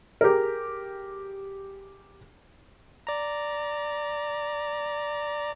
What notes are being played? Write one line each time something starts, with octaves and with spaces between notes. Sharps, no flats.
G4 G#4 A#4
D5 A#5